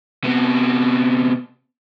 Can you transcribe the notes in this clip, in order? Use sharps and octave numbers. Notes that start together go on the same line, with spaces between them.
C3 B3